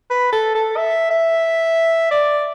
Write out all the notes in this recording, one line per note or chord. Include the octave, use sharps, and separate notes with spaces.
B4
A4
A4
E5
E5
D5